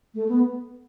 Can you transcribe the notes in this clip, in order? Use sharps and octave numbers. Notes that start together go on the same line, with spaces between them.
A3
B3